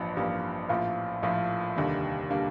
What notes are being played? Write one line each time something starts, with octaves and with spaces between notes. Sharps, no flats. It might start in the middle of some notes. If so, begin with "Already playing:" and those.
Already playing: A1 G2 F3 A#3
A1 G2 F3 A#3
A#1 A2 F3 A#3 F4
A#1 A2 F3 A#3 F4
F1 D#2 D3 G3 A#3
D3 G3 A#3